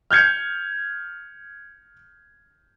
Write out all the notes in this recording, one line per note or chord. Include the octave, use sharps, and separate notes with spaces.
F6 G6 G#6 C#7